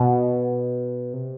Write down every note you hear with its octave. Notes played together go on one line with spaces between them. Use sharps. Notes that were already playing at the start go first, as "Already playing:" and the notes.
Already playing: B2
C3